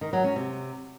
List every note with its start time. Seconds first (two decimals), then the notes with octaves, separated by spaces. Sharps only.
0.01 D#3
0.13 F#3
0.24 C#4
0.36 C3